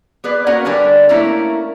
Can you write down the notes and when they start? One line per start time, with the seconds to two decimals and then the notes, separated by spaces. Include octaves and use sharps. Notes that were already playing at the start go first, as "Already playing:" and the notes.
0.24 B3 G#4 B4 D5
0.47 A#3 C#4 F#4 A#4 F#5 G#5
0.65 D3 G3 D4 A#4 B4 G#5
1.09 A3 A#3 C#4 E4 A#4